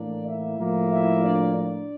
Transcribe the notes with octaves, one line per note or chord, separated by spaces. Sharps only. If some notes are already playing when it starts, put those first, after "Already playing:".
Already playing: A2 E3 A#3 D4 D5
E4 E5
A2 F3 A#3
E4 E5
D4 D5
D4 D5